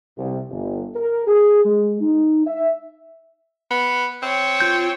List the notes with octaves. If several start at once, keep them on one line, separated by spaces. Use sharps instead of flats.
C2
G1
A#4
G#4
G#3
D#4
E5
B3
C4 C#5 G5
F4 G6